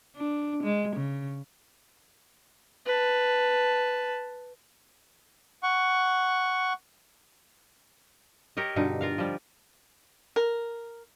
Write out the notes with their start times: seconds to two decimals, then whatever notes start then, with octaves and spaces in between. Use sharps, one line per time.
0.17 D4
0.63 G#3
0.95 C#3
2.86 B4 A5
5.63 F#5 C#6
8.57 G4 A#4 C#5 D#5
8.76 G2 B2 D3 D#4
9.01 F4 A#4 F5
9.18 F3 G3
10.36 A#4